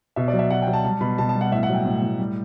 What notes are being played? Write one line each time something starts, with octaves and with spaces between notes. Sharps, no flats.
B2 E5
D5
F#3
E5
B2 F#5
G5
F#3
A5
G3 A5
B2 B5
B2 A5
A5
G3
F#5
A2 E5
F#5
F#3
G5
A2
A2
G3